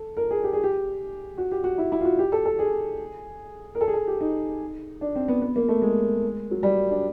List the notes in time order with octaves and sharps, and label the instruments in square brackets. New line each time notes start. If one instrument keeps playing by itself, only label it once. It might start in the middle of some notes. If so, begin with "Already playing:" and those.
Already playing: [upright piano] A4
A#4
G#4
G4
G#4
G4
F#4
G4
F#4
E4
E4
F4
F#4
G4
A4
A4
G#4
A#4
A4
G#4
A4
G4
D#4
D4
C4
B3
B3
A#3
A3
G#3
F#3
G3
D4